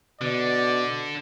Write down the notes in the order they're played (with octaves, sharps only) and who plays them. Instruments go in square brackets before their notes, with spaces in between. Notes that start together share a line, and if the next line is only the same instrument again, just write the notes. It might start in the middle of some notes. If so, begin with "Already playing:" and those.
[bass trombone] B2 [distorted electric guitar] D3 [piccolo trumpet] D5